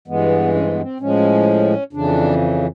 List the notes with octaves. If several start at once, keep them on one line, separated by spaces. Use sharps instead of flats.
G2 E3 G#3 B3
C#4
C4
B3
C4
A2 F3 G#3 C#4
F2 C#3 E3 D4